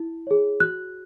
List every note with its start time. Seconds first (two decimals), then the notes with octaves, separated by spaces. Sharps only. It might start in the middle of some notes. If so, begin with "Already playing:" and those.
Already playing: E4
0.27 G#4 C#5
0.60 F#4 F#6